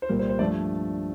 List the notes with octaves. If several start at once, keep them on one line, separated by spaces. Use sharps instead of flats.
C5
C2 A#2 G3 A#3 A#4
C5
C5
G2 F3 A3 D4 D5